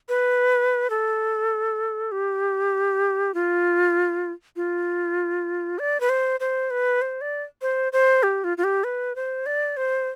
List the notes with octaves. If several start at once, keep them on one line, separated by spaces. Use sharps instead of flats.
B4
A4
G4
F4
F4
D5
B4
C5
C5
B4
C5
D5
C5
C5
G4
F4
F4
G4
B4
C5
D5
C5